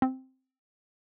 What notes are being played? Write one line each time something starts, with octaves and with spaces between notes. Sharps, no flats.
C4